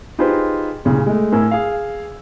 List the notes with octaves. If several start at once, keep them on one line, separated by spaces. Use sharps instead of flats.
D#4 F4 G4 G#4 B4 C5
C2 A#2 C#3
G#3 A3
A2 A#4 G#5 E6
G#4 F5